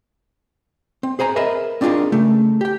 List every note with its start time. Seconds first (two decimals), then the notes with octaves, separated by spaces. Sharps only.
1.03 C4
1.19 G#4 C5 G#5 A#5
1.36 G#4 A#4 B4 D#5 E5
1.81 C4 D4 D#4 F4 G#4 A#4
2.12 C#3 A3
2.61 G4 G5